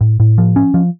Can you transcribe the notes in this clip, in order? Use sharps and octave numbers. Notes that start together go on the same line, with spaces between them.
A2
A2
F3
C#4
F3